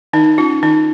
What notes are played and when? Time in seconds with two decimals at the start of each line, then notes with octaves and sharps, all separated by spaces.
0.13 D#3 D#4
0.38 C#4 F4
0.63 D#3 D#4